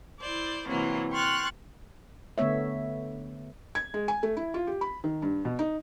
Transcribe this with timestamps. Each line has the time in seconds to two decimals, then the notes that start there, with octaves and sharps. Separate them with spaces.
0.20 E4 C5 D5
0.67 C3 E3 F#3 A#3
1.12 G5 C6 C#6 F6 F#6 A6
2.38 D3 A3 B3 C#5 E5
3.75 G#6
3.94 G#3
4.08 G#5
4.23 A3
4.37 E4
4.54 F4
4.67 G4
4.81 B5
5.04 D#3
5.22 G2
5.45 B2
5.59 D#4